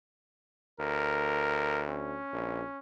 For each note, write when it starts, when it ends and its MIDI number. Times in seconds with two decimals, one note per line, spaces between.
0.80 2.18 38
0.80 1.84 70
1.89 2.79 61
2.33 2.62 34